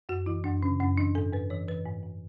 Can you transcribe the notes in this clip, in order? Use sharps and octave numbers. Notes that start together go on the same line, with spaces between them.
F#2 F#4
E3 E4
F#2 D4
C#3 C#4
F#2 C#4
E3 D4
G#2 A4
G#2 B4
E3 C#5
E3 B4
G#2
G#2